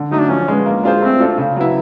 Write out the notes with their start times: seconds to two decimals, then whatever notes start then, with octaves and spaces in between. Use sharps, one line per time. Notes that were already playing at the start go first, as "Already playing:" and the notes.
Already playing: D3
0.11 F#3 A3 D#4
0.21 D4
0.29 F3 C#4
0.48 G#3 B3
0.66 A#3
0.84 D4 F4 G#4 C5
1.02 A3 C4
1.20 D4 F4 A4
1.38 C#3
1.56 F#3 B3 E4